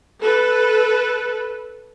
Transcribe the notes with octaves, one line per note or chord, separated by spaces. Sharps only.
A4 B4